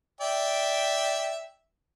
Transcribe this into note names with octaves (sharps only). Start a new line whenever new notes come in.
D5 E5 G5